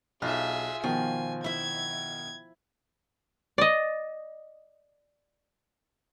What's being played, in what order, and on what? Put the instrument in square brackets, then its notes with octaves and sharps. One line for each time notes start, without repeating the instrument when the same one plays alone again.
[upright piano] B1 [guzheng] F4 [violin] G#4 E5
[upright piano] B2 D#3 [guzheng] F3 [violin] G#5
[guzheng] E4 E5 [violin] G#6
[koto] D5 D#5